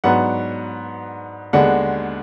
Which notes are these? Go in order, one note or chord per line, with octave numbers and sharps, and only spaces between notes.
G#2 F#3 B3 D4 F#5
D#2 D3 G#3 B3 D4 F#5